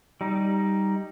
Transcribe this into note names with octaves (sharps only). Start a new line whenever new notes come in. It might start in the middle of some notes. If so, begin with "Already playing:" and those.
G3 D#4